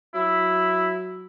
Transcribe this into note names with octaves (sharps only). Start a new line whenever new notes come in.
F#3 E4